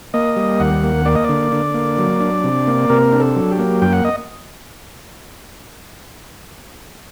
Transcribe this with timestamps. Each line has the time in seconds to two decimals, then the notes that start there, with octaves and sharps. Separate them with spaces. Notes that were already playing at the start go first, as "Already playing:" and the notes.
0.14 A#3 D#5
0.36 G3
0.60 D#2 F#5
0.83 A#3
1.06 A#3 D5
1.15 D#5
1.24 D3 D5
1.52 D3
1.74 A#3
1.98 F#3
2.21 D4
2.44 C3
2.67 A#3
2.90 C3 A#4
3.13 D4
3.20 A4
3.36 F#3
3.51 G4
3.59 A#3
3.82 F#2 G5
3.93 F#5
4.05 D#5